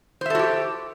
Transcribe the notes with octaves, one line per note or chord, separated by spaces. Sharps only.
F#4 G4 A4 C5 E5